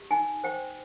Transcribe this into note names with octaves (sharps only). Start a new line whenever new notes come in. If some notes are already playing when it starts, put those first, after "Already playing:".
Already playing: G4
D#4 G#5
C5 G5